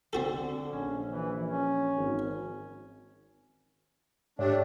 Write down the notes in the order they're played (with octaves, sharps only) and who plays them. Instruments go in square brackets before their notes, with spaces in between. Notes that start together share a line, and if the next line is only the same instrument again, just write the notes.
[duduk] D3 [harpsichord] C4 F#4 A4
[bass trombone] A#1 [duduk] C#4
[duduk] E3
C#4
[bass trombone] G#1
[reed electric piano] G#2 [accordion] A3 D4 [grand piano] G4 C#5 D5